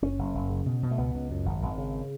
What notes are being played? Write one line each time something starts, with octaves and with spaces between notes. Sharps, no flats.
F#1 C#4
F#1
F#1
C#3
B2
B2
A3
C#2 B3
C#2
F#2
G#1
G#1
C#3